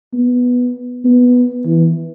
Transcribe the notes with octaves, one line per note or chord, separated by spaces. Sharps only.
B3
B3
E3